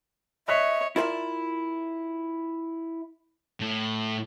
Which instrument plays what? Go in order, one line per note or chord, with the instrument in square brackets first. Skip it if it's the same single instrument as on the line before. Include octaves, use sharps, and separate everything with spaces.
[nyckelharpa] C#5 [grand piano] D#5 F#6 B6 [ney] E5
[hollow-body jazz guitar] E4 F4 A#4 C5 D5 E5
[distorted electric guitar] A2